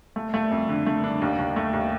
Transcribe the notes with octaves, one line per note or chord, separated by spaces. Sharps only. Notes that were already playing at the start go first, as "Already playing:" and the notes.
A3
A3
F2
D3
A3
D4
D#2
D#2
A3
D#2